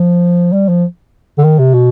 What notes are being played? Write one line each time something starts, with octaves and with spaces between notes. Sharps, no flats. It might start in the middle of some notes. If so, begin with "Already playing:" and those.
Already playing: F3
G3
F3
D3
D#3
C3
B2